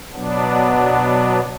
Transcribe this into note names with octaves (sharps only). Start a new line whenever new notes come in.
B2 F#3 B3 D4